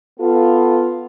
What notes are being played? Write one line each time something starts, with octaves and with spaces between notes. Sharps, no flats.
B3 F4 A4